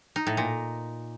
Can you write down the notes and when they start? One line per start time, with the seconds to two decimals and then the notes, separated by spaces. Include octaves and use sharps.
0.16 D#4
0.27 A2
0.37 A#2